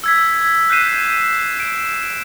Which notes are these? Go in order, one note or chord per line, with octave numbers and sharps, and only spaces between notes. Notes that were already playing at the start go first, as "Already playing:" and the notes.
E6 G#6 B6
F#6 G6 B6 C7 D#7 E7
D7 E7